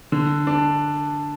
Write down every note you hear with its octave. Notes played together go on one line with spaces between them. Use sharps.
D3
D4